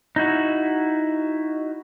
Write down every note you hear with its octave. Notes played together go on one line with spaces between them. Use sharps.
D#4 E4 F#4